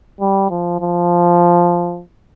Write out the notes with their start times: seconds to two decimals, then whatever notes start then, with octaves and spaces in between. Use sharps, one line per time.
0.21 G3
0.51 F3
0.80 F3